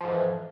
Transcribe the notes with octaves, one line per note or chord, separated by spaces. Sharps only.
F2 G#2 E3 F3